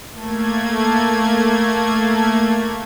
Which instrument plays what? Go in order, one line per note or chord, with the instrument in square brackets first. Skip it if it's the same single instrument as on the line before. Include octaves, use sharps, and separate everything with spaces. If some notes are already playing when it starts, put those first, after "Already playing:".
[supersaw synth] A3 A#3 G#6